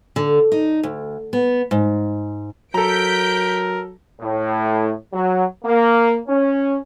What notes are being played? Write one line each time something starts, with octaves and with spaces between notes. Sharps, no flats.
D3
D#4
D2
B3
G#2
F#3 A4 A#4 A#5 G6 B6 D7
A2
F#3
A#3
C#4